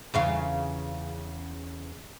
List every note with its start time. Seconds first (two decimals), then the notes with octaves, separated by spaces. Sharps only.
0.14 E2 C#3 F4